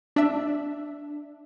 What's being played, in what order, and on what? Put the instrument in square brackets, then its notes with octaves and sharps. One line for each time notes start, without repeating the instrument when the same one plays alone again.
[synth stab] D4 E5